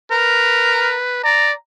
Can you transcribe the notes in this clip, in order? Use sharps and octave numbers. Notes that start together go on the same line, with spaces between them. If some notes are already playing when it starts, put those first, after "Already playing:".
A#4 B4
D5 A#5